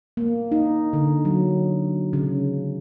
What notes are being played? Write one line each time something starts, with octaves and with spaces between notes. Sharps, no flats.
A#3
D#4
D3
F#3
C#3